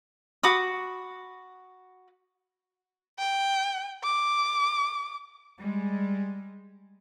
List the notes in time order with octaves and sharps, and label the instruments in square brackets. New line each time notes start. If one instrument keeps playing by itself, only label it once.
[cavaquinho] F#4 B5 D6 D#6
[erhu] G5
D6
[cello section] G3 G#3